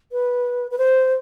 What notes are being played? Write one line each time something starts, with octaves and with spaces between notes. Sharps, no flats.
B4
B4
C5